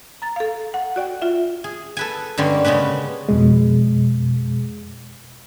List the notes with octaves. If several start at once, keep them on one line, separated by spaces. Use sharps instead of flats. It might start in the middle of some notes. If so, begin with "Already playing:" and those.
A#5 A6
A4 F5
F#5
F#4 D5 G5
F4 E5
G#4
A4 B4 G#5
G2 D3 G3 G#3 A#3 C#4
C#3 G#3 B3 C#4 B4
F2 B2 G#3